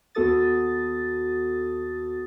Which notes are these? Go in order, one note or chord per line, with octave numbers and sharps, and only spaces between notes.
D#2 B3 F#4 A4 D#6 A6